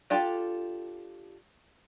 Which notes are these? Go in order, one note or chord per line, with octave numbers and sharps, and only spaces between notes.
D4 F4 G4 A4